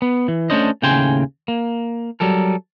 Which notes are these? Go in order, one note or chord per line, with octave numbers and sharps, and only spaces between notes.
B3
E3
A3 C#4 D4 C5 D#5
D#2 A2 C#3 G5 G#5 C6
A#3
F#3 G3 A4 A#4